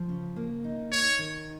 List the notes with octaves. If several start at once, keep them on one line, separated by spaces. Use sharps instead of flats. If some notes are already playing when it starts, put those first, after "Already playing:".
Already playing: F3
C#3
A#3
D#4
D#4 C#5
D#3